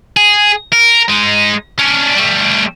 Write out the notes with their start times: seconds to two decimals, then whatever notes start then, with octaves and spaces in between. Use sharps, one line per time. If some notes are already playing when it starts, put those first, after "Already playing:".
0.17 G#4
0.72 A#4
1.09 G#3 D#4
1.79 C#4 D4
2.16 G3 A3